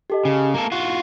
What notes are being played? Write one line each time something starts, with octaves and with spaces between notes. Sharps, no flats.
G4 A4 D#5
C#3 G#5
A#3 A4
F4 F#4